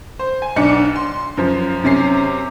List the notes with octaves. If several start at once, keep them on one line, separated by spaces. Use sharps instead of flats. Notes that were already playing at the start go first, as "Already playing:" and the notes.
C5
G#5
B1 D4 C#7
C6
F#2 F3
F#2 C3 C#4 C7